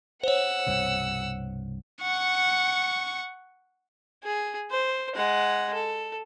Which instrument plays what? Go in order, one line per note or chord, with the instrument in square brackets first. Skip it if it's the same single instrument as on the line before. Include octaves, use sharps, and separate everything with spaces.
[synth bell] C5 C#5 [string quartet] F#5 E6
[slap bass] C2 G2 B2
[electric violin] F#5 C#6
[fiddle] G#4
C5
G#3 F#5
A4